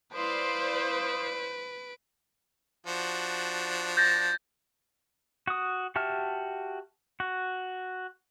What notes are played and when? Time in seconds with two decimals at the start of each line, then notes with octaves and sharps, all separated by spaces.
0.14 E4 B4 C5 D5 F5 C6 D#6 D7
2.87 F3 D4 F#4
3.97 G6 A6 A#6
5.47 F#4 D#6
5.96 F#4 G4 E5 A5 F6
7.20 F#4